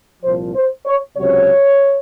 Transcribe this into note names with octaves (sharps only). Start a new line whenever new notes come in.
C2 A#2 F3 C5
C5
C#5
C#2 C3 F#3 C#5